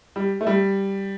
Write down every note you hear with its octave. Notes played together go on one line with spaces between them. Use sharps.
G3
A3
G3